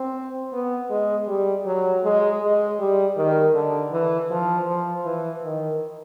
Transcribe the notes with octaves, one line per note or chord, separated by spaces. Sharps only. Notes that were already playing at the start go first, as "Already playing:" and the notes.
Already playing: C4
B3
G#3
G3
F#3
G#3
G#3
G3
D#3
D3
E3
F3
F3
E3
D#3